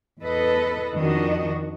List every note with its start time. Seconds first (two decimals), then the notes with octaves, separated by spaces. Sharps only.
0.20 E2 A4 B4 D#5
0.94 F2 D#3 D4 F#4 D#5